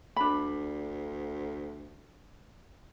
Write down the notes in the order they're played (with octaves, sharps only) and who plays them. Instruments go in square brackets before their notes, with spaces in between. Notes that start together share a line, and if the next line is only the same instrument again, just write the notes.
[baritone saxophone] D2 [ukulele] D4 B5